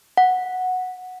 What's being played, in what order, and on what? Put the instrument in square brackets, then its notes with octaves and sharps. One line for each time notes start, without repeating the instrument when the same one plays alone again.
[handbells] F#5